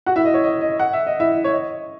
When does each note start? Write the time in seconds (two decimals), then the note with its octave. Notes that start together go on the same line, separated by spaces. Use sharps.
0.06 F#4 F#5
0.16 E4 E5
0.25 D#5
0.34 C#5
0.44 D#5
0.61 D#5
0.80 F#5
0.93 E5
1.07 D#5
1.20 E4 E5
1.44 C#5
1.51 D#5